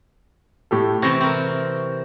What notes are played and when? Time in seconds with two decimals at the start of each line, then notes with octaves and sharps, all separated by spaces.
0.71 A2 G4 A4
1.02 C3 E3 C4 C#6 A#6
1.21 C4 A#4